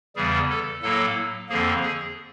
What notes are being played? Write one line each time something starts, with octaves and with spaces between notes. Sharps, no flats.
E2 C#3 E3 G3 G#4
A4
A2 F#3 A#3 A4
F2 D3 F3 A#3 G#4
G#4